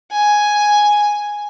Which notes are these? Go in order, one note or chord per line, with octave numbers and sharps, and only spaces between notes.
G#5